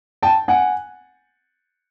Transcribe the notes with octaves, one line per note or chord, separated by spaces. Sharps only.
G5 A5
F#5 G#5